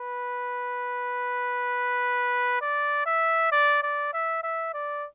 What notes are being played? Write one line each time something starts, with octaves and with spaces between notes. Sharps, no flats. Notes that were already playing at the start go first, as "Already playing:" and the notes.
Already playing: B4
D5
E5
D5
D5
E5
E5
D5